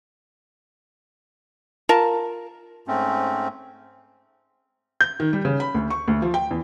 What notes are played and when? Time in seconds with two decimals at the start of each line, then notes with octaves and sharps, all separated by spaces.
1.89 F4 A#4 A5
2.87 G#2 A3 C4 C#4
5.01 G6
5.20 D#3
5.33 G3
5.45 C#3
5.60 B5
5.74 D2
5.90 C#6
6.08 D2
6.22 F3
6.34 G5
6.51 E2